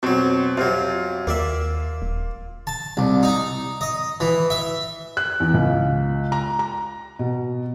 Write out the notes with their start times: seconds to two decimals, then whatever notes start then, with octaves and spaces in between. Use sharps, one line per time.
0.03 F2 B2 F#3 C4
0.57 F2 C3 F#3 F4
1.27 D#2 A#3 D5 E5
2.02 D1
2.67 A5
2.97 C2
3.23 D#4
3.81 D#5
4.20 E3
4.50 E5
5.17 F#6
5.40 E2
5.54 C#2
6.32 A#5
6.59 A#5
7.19 B2